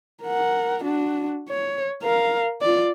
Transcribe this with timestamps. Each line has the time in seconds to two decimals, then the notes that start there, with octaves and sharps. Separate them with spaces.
0.23 A#4 F#5
0.84 D4 F#4
1.50 C#5
2.03 A#4 F5
2.62 F4 D5